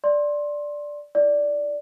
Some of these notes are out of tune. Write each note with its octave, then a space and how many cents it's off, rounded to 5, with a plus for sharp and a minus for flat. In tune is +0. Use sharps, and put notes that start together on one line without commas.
D5 +0 C6 +20
E4 +0 D5 -5